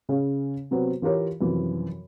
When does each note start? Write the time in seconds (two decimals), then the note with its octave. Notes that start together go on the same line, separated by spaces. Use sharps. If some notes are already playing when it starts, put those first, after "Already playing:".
0.09 C#3 C#4 G#4 F5
0.71 C3 F#3 B3 C4
1.02 E3 F4 G4 A#4 C#5
1.41 F#2 C3 E3 F3